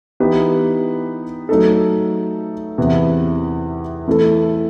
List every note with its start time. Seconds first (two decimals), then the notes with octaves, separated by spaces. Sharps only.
0.20 E3 B3 D#4 G4 B4
1.49 F#3 A3 D#4 A4
2.78 E2 C3 E3 B3
4.07 E3 A3 E4 A4